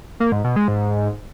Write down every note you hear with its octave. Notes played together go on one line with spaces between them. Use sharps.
A#3
G#2
B2
G#3
G#2